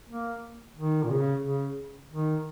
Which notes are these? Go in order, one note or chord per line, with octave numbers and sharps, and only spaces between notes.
A#3
D#3
A#2
C#3
C#3
D#3